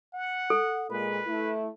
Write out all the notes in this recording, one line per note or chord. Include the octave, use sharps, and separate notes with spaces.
F#5
A4
A#2 G#3 B4
A3 E4